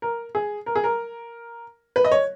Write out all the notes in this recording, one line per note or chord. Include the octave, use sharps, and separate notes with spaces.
A#4
G#4
A#4
G#4
A#4
B4
D#5
C#5